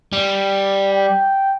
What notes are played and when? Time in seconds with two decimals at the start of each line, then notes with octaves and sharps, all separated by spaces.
0.13 G3
0.93 G5